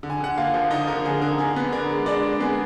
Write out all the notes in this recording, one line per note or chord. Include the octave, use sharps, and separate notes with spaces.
D3
G#5
D3 F#5
A#3 F4 F5
F3
D3 D#4 D#5
D3 A#4
D3 G#4
D3 A#4
D3 G#4
B3
D4 A#4
G#3
G#3 D4 D5
G#3
B3 G#4